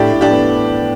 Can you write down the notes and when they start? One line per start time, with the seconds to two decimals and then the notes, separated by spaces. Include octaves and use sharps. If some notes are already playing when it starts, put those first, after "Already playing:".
Already playing: A2 D4 G4 E5
0.12 A2
0.21 D4 G4
0.31 B3